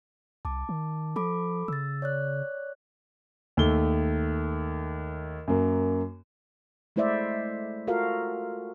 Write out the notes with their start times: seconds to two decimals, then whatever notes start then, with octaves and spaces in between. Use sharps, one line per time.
0.45 C2 A5 D6
0.69 D#3
1.16 F3 A4 B5 D6
1.68 C#3 E6 A6
2.02 C#5 D5 F#6
3.57 D#2 D#3 A3 G7
5.48 F#2 A#3
6.96 G#3 A3 E4 C5 D5 E5
7.87 F4 F#4 A4 A#4 F5